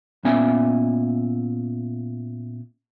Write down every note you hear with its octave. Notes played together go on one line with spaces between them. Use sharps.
A#2 B3 C#4 D5 E5 G#5